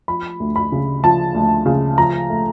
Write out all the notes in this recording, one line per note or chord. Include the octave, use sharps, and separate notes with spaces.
F3 B5
D2
B5
C#3
F3 A5
D2
C#3
F3 A#5
A3